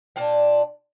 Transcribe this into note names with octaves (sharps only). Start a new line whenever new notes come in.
A#2 D4 F4 G5